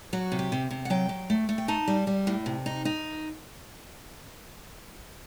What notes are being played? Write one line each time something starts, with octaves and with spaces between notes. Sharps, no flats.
F#3 F#4
C3
G4
C3
C3
F#5
F#3 G5
F#3
A3
A3
G5
D#4 A5
G3
G3
A2
C3
D#4
D#4